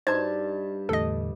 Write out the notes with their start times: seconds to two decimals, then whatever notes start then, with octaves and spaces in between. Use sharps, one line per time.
0.07 G2 D#4 C5 A5 G#6
0.89 E2 A2 D3 A4 D#5